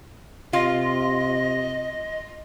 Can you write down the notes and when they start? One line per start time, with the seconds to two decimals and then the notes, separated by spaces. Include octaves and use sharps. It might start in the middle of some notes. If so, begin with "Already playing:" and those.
0.53 C3 F4 D#5